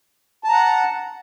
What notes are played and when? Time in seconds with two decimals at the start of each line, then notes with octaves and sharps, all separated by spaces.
0.44 A5
0.48 A#5
0.53 F#5